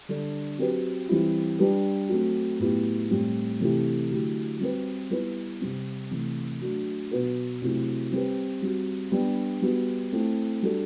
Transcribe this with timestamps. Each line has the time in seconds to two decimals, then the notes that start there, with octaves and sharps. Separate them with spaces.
0.09 D3 G3 D4 A4
0.59 F#3 C4 G4 B4
1.09 E3 G3 C4 E4
1.59 G3 D4 G4 B4
2.09 F#3 A3 C4
2.60 A2 F#3 B3 E4 G4
3.09 A2 G3 C4
3.60 C3 E3 A3 E4 G4
4.10 D3 F#3 A3 E4 G4
4.60 G3 C4 F#4 B4
5.10 G3 B3 E4 B4
5.61 C3 G3 C4
6.11 C3 E3 A3
6.61 F#3 A3 D4 F#4
7.11 B2 F#3 B3 F#4 B4
7.62 C3 F#3 A3 C4 E4
8.12 G3 C4 G4 B4
8.62 G3 C4 F#4
9.12 G3 B3 D4 G4
9.62 G3 B3 F#4
10.13 A3 C4 E4
10.62 G3 D4 F#4 A4